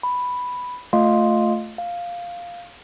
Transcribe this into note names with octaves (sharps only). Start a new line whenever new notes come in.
B5
A3 F4 D#5 F5 C6
F5